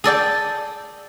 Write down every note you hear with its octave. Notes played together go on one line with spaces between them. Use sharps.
G#4 A4 D5 G5